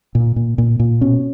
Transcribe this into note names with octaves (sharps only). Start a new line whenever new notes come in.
A#2
A#2
A#2
A#2
B2 C#4